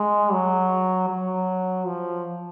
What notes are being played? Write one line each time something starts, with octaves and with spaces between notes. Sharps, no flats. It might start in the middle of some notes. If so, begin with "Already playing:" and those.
Already playing: G#3
F#3
F#3
F3